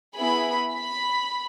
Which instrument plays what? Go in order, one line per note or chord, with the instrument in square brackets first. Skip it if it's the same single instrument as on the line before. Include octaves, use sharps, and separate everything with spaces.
[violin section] B3 E4 G#4 B5
B5